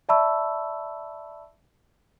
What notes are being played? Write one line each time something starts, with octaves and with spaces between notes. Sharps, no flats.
D5 E5 A5 B5 C#6 E6